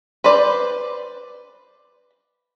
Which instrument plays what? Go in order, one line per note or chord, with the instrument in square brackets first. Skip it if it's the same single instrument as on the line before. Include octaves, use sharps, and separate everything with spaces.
[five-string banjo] B4 C5 D5